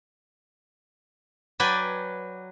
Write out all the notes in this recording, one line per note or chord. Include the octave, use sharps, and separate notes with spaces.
F#3 B4 D5 G5 G#5